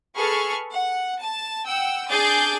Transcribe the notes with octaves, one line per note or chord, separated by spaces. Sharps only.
G#4 A4 B4 C#6 F6
F#5
A5
F#5 G5 E6
D4 G#4 D6 D#6 G6 A6